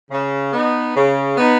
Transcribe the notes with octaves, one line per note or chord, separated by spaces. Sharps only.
C#3
B3 D#4
C#3
B3 D#4